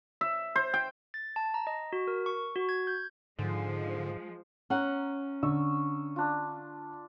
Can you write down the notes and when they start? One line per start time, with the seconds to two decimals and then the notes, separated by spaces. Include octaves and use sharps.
0.21 E5
0.56 C5
0.74 G5
1.14 A6
1.36 A5
1.54 A#5
1.67 D#5
1.93 F#4
2.07 A#4
2.26 C#6
2.56 F#4
2.69 G#6
2.87 G6
3.39 G#2 D3 F3 G#3
4.70 C#4 F#5 A#5
5.43 D3 C#6 E6
6.16 D4 F4